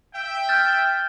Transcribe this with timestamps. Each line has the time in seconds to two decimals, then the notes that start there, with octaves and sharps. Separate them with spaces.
0.14 E5 G5
0.49 F6 G6 A6